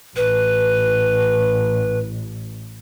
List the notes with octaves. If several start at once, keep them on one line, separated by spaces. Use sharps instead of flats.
A1 B4